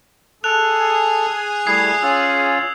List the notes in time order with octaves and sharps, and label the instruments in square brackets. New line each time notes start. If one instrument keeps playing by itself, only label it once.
[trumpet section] G#4 [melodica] A4 [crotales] F#6 F7
[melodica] G3 A3 E4 [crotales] D#6 G#6 C7
[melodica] C#4 F4 [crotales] E6